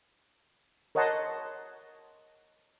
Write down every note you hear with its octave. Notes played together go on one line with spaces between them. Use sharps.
A#4 C#5 D#5 F#5 A5 C6